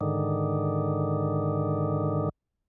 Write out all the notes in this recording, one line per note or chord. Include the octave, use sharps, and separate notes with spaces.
G#2 D3 D#3